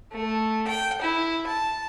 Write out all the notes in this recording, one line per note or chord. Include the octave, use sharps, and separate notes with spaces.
A3
G5
E4
A5